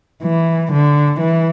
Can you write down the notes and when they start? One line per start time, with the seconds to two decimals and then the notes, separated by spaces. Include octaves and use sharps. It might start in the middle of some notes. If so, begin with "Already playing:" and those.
0.23 E3
0.72 D3
1.20 E3